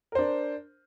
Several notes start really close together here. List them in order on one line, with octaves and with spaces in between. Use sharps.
A#4 C5 D4